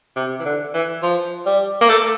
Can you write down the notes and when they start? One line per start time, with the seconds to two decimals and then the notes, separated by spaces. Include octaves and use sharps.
0.16 C3
0.39 E3
0.45 D3
0.74 E3
1.03 F3
1.46 G3
1.81 A#3
1.89 A3